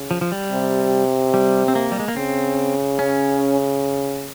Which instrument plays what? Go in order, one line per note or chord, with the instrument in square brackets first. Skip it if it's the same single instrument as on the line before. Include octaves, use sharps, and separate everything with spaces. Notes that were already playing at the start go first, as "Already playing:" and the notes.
Already playing: [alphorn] C#3
[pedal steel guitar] F3
F3
G3
[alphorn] C3
[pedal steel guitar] G3
C4
A#3
G3
G#3
A#3
[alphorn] C#3 [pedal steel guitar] C4
[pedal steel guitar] C#4